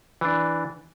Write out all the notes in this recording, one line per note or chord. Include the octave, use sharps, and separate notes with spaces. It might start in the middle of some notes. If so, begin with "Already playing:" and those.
E3 D4